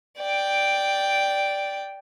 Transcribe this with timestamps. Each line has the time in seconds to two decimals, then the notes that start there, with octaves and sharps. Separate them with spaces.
0.18 D5 G5